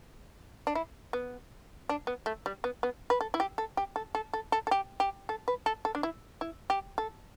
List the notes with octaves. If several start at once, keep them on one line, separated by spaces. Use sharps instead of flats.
D4
E4
B3
D4
B3
A3
G3
B3
B3
B4
A4
E4
G4
A4
G4
A4
A4
A4
A4
A4
G4
G4
A4
B4
A4
A4
D4
E4
E4
G4
A4